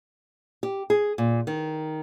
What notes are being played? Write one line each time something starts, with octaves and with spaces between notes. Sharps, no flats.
G4
G#4
A#2
D#3